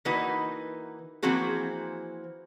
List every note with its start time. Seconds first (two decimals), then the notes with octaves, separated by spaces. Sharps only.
0.05 E3 A#3 D#4 F#4 B4
1.22 E3 F3 A#3 C4 F#4 G#4